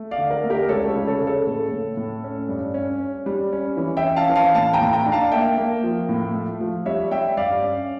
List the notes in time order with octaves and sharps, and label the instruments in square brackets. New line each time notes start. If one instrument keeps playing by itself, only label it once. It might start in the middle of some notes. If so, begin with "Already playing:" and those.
Already playing: [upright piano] A3
D5 F5
D3
A#4 D5
A3
G4 A#4
C#2 A4 C#5
A4 C#5
C#3
A4 C#5
C#3
A4 C#5
A2
A2
A2
C#4
G2
C#4
C#4
G3
C#4
E3
E5 G5
C#4
F5 A5
E3
F5 A5
A2 F5 A5
G5 A#5
A2
G5 A#5
D4
F5 A5
A#3 E5 G5
A#3
F3
A2
A3
F3
G3 C#5 E5
G3 E5 G5
G2 D5 F5
C#4